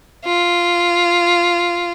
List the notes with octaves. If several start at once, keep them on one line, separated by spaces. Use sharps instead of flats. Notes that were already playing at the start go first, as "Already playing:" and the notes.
F4